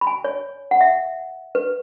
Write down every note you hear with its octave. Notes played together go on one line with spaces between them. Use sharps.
B5
G#5
C#5
F#5
E5
B4